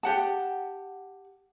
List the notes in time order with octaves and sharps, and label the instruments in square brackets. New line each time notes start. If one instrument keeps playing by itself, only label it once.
[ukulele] G4 F#5 A5